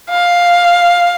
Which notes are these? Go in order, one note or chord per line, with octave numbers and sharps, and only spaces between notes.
F5